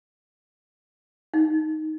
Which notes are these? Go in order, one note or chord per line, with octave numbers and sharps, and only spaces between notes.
D#4